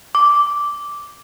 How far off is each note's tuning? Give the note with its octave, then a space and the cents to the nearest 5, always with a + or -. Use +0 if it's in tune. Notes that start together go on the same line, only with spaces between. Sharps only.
D6 -10